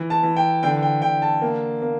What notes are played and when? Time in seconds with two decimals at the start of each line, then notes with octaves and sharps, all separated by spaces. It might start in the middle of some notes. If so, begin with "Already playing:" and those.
Already playing: E3
0.10 A5
0.23 E3
0.36 G5
0.63 D3 G5
0.82 G5
1.02 D3 G5
1.22 A5
1.42 A#3
1.82 A#3